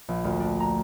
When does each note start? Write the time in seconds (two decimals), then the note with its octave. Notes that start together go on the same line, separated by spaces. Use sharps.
0.08 A#1
0.24 D2
0.40 D4
0.60 A#5